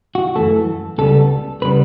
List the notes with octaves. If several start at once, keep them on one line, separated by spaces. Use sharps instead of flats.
F#4
F#2 E3 A3 A4
C#2 C#3 G3 B3 A4
C#3 G3 B3 B4